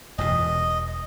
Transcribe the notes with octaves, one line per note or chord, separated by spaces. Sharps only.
E1 E2 B2 D#5